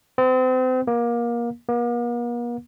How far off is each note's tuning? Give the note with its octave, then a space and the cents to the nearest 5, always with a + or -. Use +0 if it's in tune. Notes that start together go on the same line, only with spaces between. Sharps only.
C4 -35
A#3 +25
A#3 +45